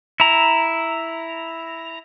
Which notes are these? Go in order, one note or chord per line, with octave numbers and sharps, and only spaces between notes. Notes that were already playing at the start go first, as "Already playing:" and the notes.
E4 A#5